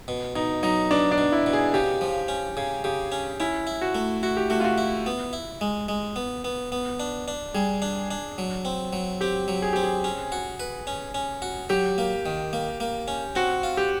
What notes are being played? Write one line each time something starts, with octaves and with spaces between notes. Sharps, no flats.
B2
B2 D#4
F#3 D#4
B2 D4
D4
B2
E4
B2
G#4
C#3 G4
F3
C#4
C#3 G#4
C#3 G4
C#4
C#4 E4
E4
F#4
A3
E4 F#4
G4
A3 F#4
F4
F#4
E4
B3
E4
G#3
G#3
B3
B3
B3
D4
D4
G3 G#4
D4
D4
F#3
C4
F#3
C4 G4
F#3
G#4
C4 G4
G#4
C#4
F#4
B4
C#4
C#4
F#4
F#3 G4
A#3
D#3
A#3
A#3
C#4
C4 F#4
F4
G4